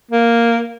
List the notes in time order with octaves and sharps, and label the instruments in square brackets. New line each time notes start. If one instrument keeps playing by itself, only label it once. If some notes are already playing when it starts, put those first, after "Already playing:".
[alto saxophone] A#3